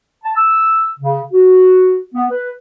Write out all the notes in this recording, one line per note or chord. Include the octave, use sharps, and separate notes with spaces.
A5
E6
C#3
F#4
B3
B4